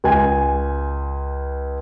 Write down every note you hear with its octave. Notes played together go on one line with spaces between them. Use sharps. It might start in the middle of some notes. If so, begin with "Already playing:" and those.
C#2 G#5